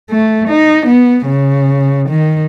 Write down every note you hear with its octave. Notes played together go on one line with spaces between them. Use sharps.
A3
D#4
B3
C#3
D#3